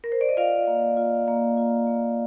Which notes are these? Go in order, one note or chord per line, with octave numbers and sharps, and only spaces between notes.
A#4
C5
D5
D#5
F4 D5 F5
A#3
F4
A#3
F4
A#3